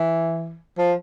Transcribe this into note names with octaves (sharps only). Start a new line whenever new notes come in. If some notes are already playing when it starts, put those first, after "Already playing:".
Already playing: E3
F3